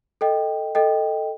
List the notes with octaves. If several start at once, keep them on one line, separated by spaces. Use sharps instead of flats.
A4 D#5 G5
A4 D#5 G5